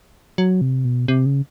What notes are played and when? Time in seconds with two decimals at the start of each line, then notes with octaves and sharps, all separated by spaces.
0.38 F#3
0.61 C3
0.85 B2
1.08 C3
1.26 C#3